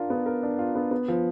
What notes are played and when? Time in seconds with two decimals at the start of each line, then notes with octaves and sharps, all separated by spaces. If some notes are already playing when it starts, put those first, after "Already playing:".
Already playing: D4 F4 A#4
0.10 B3
0.26 A#4
0.43 D4
0.59 F4
0.75 B3
0.91 B3
1.08 F3